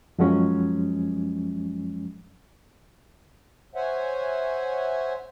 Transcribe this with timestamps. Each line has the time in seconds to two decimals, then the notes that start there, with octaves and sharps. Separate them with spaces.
0.19 F#2 F3 F#3 G#3 C#4
3.75 C5 C#5 E5 F#5 G#5